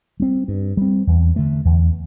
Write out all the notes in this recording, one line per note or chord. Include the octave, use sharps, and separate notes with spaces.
G3 C4
G2
G3 C4
E2
D3 A3
E2